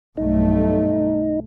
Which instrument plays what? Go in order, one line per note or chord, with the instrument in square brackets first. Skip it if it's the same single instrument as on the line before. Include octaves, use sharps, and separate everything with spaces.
[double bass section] B1 G2 A3 [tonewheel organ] D#4